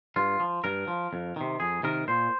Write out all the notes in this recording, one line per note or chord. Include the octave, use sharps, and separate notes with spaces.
G2 F4
F3
G2 A#4
F3
F2
C3 D#3
F2 G#4
C3 D#3 A#4
A#2 C5